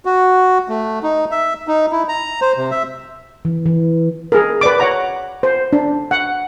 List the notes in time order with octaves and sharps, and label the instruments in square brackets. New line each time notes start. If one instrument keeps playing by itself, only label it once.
[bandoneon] F#4
A3
D#4
E5
D#4
E4
A#5
C5
C3
E5
[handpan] E3
E3
[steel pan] G#4 A#4
B4 D5 D6
C#5 F#5 A#5
C5
D4
F#5